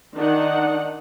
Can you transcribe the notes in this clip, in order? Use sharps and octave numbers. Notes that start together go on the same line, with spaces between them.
D#3 D4 D#4 F#5